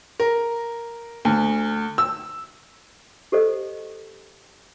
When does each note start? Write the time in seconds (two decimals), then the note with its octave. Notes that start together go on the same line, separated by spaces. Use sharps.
0.20 A#4
1.25 D2
1.98 E6
3.32 G4 A4 C5 D#5